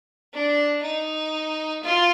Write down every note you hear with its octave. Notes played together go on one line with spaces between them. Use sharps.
D4
D#4
F4